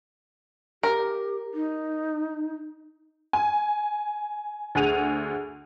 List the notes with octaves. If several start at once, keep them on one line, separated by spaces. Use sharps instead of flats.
G4 A#4
D#4
G#5
D2 G#4 F#5 D#7 F7